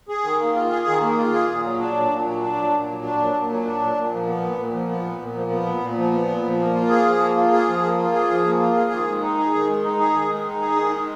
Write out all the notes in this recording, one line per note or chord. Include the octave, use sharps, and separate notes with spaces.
G#4
D#3
A#3
F4
G#4
D#3
A#3
F4
G#4
A#2
F#3
D4
A#2
A#2
F#3
D4
A#2
A#2
F#3
D4
A#2
A#2
F#3
D4
A#2
A#2
F3
B3
A#2
A#2
F3
B3
A#2
A#2
F3
B3
A#2
A#2
F3
B3
A#2
F3
A#3
F4
G#4
F3
A#3
F4
G#4
F3
A#3
F4
G#4
F3
A#3
F4
G#4
D#3
G#3
D#4
G#4
D#3
G#3
D#4
G#4
D#3
G#3
D#4
G#4
D#3
G#3